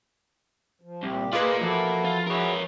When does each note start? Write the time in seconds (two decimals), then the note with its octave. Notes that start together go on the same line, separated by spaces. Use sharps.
0.82 F3
1.03 C2 A#2 G4
1.33 A#3 F4 G#4 A#4 B4 D5 D#5 F5
1.61 E3 F3 E4 F#4 A4
2.05 F4
2.27 E4 F#4 G#4 A#4 C#5